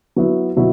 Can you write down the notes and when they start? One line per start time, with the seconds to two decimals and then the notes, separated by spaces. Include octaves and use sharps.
0.16 F#3 B3 E4
0.56 B2 F#3 E4